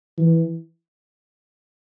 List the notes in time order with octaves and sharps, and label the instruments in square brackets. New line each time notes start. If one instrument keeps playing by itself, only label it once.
[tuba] E3